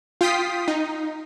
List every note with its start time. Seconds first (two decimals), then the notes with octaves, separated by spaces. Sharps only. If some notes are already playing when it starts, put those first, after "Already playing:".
0.21 F4 G5 D#6 B6 C7
0.68 D#4